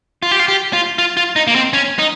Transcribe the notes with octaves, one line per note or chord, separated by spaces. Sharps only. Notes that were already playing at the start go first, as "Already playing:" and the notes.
F4
G4
F4
G4
F4
F4
F4
D#4
A#3
C4
C#4
D#4